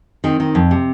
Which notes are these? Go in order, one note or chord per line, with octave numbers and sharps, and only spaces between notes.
D#3 C4
D#3
F2
C3